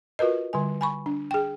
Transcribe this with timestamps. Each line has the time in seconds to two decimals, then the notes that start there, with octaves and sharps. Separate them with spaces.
0.19 F4 F#4 A#4 B4 D#5
0.53 D3 G3 G#5
0.81 G#5 B5 C#6
1.06 D4
1.31 G#4 G5